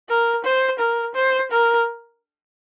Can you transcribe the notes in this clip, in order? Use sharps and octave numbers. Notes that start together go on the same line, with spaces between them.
A#4
C5
A#4
C5
A#4